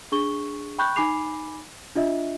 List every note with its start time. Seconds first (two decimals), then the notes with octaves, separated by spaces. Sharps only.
0.12 D4 G#4 C#6 G7
0.79 G5 B5 C#6 F#6 G6
0.96 D#4 G#5 B5 D6 C7 F7
1.95 D4 F4 D#5 E5